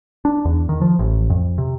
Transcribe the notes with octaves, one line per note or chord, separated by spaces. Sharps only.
D4
E2
D#3
F3
A1
F2
C3